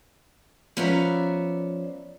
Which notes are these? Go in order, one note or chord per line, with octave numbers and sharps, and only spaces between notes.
F3 B3 C#4 D5 E5 A#5